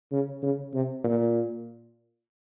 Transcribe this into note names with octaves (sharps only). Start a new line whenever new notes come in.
C#3
C#3
C3
A#2